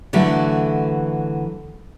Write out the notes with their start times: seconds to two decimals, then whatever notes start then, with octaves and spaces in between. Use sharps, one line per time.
0.13 D3 E3 F#3 A3